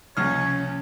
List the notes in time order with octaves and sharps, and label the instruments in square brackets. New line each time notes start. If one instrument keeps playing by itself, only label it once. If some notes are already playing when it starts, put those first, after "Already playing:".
[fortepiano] C#2 F6 [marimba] C3 F3 A#3 [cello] C#4 [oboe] C#5